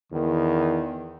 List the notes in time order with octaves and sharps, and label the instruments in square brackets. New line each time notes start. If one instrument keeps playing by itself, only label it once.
[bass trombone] E2 [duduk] D#3